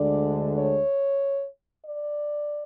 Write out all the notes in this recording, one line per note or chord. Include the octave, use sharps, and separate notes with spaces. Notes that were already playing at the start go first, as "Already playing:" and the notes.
Already playing: D2 D3 G#3 D4 D5
C#5
D5